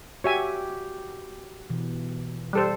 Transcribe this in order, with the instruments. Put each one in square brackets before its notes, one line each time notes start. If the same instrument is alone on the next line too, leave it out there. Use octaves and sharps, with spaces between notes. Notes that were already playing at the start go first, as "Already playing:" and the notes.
[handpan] F#4 G4 [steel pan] C#5 E5 G#5
[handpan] B2 E3
[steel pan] G3 A4 C5